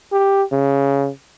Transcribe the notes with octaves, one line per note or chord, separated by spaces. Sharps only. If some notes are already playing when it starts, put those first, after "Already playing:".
G4
C#3